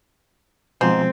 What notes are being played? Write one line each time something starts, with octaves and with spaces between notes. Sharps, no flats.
G#2 B2 F3 G#3 C4 C5